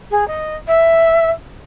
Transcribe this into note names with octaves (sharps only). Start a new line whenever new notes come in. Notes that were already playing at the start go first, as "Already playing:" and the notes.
G#4
D#5
E5